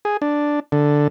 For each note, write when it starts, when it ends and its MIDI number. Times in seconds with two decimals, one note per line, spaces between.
0.05 0.17 68
0.22 0.60 62
0.72 1.08 50